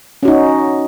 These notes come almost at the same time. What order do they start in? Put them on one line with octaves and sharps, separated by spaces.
C#4 F#4 D#4